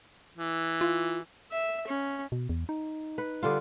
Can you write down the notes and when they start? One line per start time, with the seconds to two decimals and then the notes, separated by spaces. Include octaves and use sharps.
0.37 E3
0.81 F4
1.52 E5
1.86 C#4
2.32 B2
2.49 E2
2.69 D#4
3.18 B4
3.43 D3 G3 F4